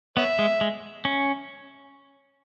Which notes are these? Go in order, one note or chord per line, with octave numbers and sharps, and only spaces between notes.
B3 C#5 E5
G#3
G#3
C#4